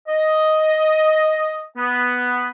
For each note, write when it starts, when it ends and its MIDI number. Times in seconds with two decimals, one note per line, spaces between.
0.08 1.65 75
1.77 2.46 59